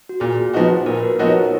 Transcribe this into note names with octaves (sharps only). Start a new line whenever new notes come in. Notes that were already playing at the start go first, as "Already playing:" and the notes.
F#4
A#2 G#4
F3 B3 D#4 F#4
A#2 A#4
B4
F#4 A#4
F3 B3 D#4 F#4 A#4 C#5